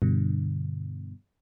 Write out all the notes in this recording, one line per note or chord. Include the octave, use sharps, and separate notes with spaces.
G2 B2 D3